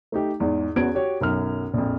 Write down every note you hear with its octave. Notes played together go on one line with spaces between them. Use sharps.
A3 D#4 G4
E2 G#2
E2 B3 C#4 F#4 G#6 D7
F#4 G4 C#5
B1 F#2 F6
A#1 F2